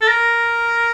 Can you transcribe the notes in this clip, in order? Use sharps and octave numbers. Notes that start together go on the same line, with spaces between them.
A4
A#4